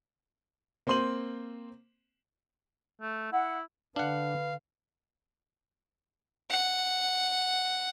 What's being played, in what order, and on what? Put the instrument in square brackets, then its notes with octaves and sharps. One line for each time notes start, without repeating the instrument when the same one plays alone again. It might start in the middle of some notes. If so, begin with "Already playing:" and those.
[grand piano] A#3 C4 C5 C6 D#7 F#7
[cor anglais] A3
[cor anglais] E4 [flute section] F#5
[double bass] D3 [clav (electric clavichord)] D4 F#5 [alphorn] B4 [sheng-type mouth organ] F5
[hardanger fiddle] F#5